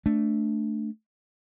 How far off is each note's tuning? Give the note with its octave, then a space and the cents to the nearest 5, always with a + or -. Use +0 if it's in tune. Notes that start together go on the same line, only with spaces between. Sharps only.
A3 +0 D4 +0